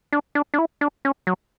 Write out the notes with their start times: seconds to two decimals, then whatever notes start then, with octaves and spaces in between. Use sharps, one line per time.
0.13 D4
0.35 D4
0.54 D4
0.59 E4
0.81 D4
1.05 C#4
1.27 F#3